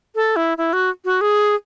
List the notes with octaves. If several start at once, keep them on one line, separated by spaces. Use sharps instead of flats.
A4
E4
E4
F#4
F#4
G#4